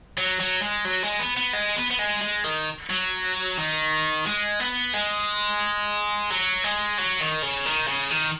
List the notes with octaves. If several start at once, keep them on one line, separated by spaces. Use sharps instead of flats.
F#3
F#3
G#3
F#3
G#3
B3
B3
G#3
B3
B3
G#3
G#3
D#3
F#3
D#3
G#3
B3
G#3
F#3
G#3
F#3
D#3
C#3
D#3
C#3
D#3